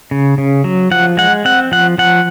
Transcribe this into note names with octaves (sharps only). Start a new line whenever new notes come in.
C#3
C#3
F#3
F3 F#5
G#3 F#5
C4 F#5
F3 F#5
F3 F#5